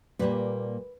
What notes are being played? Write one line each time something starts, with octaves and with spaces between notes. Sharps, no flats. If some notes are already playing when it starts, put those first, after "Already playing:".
A#2 G3 A#3 B4